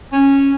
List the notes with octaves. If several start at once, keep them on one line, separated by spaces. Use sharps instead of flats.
C#4